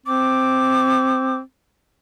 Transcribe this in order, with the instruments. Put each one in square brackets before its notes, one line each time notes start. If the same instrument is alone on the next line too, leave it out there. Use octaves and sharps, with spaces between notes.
[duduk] C4 [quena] D6